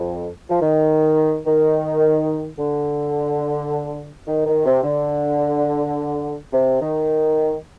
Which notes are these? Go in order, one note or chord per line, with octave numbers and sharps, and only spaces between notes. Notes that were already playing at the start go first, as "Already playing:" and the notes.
Already playing: F2
F3
D#3
D#3
D3
D#3
D#3
C3
D3
C3
D#3